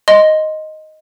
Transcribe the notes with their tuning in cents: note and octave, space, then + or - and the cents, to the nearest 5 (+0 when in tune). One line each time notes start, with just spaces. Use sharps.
D#5 +0 C6 +0